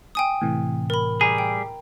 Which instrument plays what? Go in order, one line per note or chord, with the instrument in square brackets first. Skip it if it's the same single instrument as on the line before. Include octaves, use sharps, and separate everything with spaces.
[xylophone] G5 G#5 D#6
[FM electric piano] A2 C3 E3
[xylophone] A#4 B5
[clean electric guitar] G3 G#4 [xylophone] A#5
[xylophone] G5